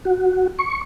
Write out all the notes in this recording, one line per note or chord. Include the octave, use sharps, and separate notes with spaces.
F#4
C#6